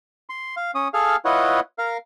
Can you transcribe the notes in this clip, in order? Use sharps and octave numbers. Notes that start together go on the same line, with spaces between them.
C6
F5
C#4 D#6
G#4 A4 F5 F6
E4 F4 B4 C#5 D#5 F#5
A#4 F5